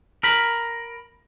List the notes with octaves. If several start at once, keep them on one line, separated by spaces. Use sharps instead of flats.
A#4 B5